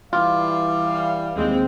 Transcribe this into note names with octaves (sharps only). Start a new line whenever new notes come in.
E3 G3 F4 F5
D#2 G#3 C4